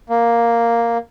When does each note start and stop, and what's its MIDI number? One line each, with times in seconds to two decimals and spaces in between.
0.09 0.97 58